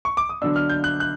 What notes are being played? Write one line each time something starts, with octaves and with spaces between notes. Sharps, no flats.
C#6
D6
D#6
D3 F#3 B3 D4 E6
F6
G6
F#6
F#6